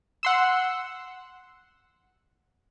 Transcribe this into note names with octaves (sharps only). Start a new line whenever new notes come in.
F#5 C6 E6